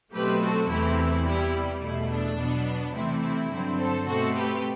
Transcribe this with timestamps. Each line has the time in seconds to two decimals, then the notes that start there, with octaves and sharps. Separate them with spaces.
0.14 B2 F#3 A3 C4 G4 B4
0.42 F#4 A4
0.70 E2 C3 E3 A3 C4 E4 G4
0.98 E4
1.26 C3 G3 B3 E4 G4
1.82 E2 B2 A3 E4
2.10 D4
2.38 B2 F#3 B3
2.94 C3 E3 A3 C4 E4
3.23 E4
3.51 G2 D3 F#3 C4
3.79 A4 C5
4.07 B2 A3 C4 F#4 A4
4.35 G4 B4